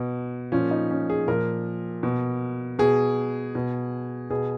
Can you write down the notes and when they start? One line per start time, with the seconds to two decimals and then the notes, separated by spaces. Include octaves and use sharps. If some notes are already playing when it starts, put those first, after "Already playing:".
Already playing: B2
0.52 A#2 F3 C#4
0.71 D#4
0.91 C#4
1.10 G#4
1.28 A#2 F3 A#4
2.03 B2
2.79 B2 G#4
3.55 B2
4.30 B2 G#4